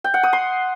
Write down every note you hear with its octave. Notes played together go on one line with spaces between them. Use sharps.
G5
F#5
D#6
C6